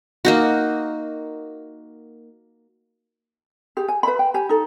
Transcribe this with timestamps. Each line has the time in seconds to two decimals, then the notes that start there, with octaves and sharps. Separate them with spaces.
0.25 A#3 D#4 F#4
3.77 G4 G#4
3.88 G#5
4.03 B4 E5 B5
4.19 G5
4.34 G4 G#5
4.49 D#4 A4